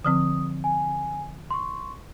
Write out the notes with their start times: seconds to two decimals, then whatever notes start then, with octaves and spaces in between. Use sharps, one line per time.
0.04 D3 F3 C4 D#6
0.64 G#5
1.51 C6 C#6